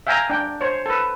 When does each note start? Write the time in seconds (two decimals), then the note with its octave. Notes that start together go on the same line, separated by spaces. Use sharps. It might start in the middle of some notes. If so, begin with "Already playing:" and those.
0.07 E5 F5 G5 G#5 A#5
0.30 D4 G5
0.61 C5 C#5
0.86 A4 B4